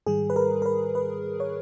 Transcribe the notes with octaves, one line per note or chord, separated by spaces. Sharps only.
G#2 D#3 G3 G#4
B4
A#4
A#4
B4
B4
C#5